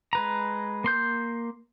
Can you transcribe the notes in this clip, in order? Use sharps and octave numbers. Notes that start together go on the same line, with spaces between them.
G#3 B4 A#5
A#3 C6 G6